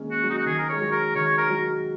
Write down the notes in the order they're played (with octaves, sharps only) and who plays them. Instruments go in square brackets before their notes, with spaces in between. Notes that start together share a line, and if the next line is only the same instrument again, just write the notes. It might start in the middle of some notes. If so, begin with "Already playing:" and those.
Already playing: [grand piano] D#3 G#3 A#3 C#4
[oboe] F#4
[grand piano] F#3
[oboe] D#4
F#4
[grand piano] D#3 [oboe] G#4
[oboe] A#4
[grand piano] G#3 [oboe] C#5
[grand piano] F#3
[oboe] A#4
[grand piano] D#3 [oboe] C#5
[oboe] A#4
[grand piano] F#3